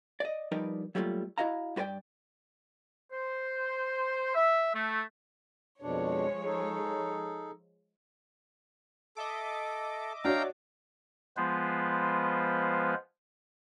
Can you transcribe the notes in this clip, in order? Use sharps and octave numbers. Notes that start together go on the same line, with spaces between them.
D5 D#5
F3 G3 D#4 A#4 B4 D5
F#3 G3 A3 A#3 C#4 F4
E4 F#4 D#5 F5 A#5
G2 F#4 B4 D5 G5
C5
E5
A3
F2 B2 F3 G#3 D4 C#5
D#4 G#4 A4
A4 D#5 E5 D6
D4 F#4 C#5 F5 G5 A#5
F3 G#3 B3 F4 B4 C5